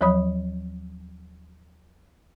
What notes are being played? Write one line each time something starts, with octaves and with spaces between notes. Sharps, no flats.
D#2 F3 F#3 C#5 B5 D#6